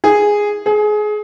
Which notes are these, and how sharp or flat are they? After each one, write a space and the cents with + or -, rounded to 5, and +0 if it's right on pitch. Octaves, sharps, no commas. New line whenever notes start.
G#4 -5
G#4 +25